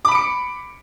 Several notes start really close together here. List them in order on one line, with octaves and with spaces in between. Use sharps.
D6 B5 D7 C#7